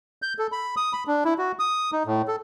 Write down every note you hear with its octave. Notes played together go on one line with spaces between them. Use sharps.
G6
A4
B5
D#6
B5
D4
E4
F#4
D#6
D#4
A2
A4